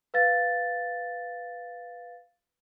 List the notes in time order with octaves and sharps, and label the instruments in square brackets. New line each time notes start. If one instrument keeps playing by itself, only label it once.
[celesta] B4 F5 A6